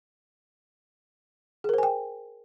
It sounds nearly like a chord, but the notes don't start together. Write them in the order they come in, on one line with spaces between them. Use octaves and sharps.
G#4 A#4 C5 G#5 G5